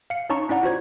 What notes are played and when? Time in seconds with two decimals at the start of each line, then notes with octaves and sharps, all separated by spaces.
0.10 F5 C#7
0.29 C#4 D#4 C#5 A5 A#5 C#6
0.49 C#4 E4 D5 F#5 A#5
0.63 F4 F#4 C5 G#6